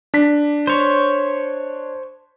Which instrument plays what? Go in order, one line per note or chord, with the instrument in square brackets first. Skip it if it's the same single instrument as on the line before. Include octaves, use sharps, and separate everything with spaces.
[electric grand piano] D4 B6
[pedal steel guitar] C5 C#5